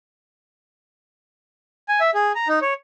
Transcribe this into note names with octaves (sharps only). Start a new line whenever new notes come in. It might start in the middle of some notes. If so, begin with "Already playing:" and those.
G#5
E5
G#4
A#5
D#4
C#5